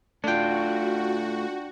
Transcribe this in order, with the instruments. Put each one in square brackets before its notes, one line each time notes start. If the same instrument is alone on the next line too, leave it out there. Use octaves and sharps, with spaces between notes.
[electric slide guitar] A3 F4 [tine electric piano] D4 G5 [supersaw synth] F#4